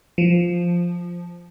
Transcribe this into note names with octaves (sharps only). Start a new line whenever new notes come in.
F3